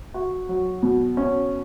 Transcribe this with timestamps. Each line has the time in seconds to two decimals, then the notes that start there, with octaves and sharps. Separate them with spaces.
0.14 F#4
0.49 F#3
0.83 B2
1.17 C#4